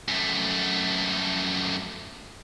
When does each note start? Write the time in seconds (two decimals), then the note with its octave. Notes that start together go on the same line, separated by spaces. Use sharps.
0.08 F#2 A3